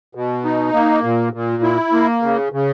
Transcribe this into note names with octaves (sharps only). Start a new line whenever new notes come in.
B2
D#4
A#3
A#2
A#2
E4
A#3
C#3
C#3